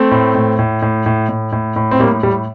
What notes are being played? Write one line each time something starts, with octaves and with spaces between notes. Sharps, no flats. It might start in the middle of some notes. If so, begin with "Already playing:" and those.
Already playing: A3 C4
A2
A2
A2
A2
A2
A2
A2
A2
C4
A2 G3 A#3
A2 G3